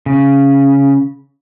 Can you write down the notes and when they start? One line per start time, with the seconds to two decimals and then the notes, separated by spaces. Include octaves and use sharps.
0.06 C#3